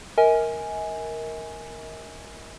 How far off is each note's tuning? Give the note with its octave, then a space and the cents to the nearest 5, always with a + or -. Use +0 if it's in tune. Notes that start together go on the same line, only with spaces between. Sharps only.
A#4 +0 D#5 +45 G#5 +0